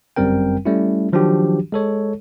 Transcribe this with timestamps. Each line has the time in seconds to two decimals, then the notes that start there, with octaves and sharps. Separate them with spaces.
0.16 G1 F#2 G3 C4 A#4 G5
0.65 G3 A3 C#4 E4
1.13 D#3 F3 F#3 D4 F#4 G4
1.72 G#3 A4 C#5